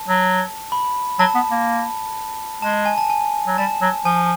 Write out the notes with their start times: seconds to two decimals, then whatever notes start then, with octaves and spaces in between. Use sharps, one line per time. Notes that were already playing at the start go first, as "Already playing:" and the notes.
Already playing: A5
0.08 F#3
0.72 B5
1.19 F#3 A5
1.35 B3
1.51 A#3
2.62 G#3 A5
2.74 A5
2.85 G#5
2.98 A5
3.10 G#5
3.47 F#3
3.58 G3 A5
3.82 F#3
4.05 F3 G#5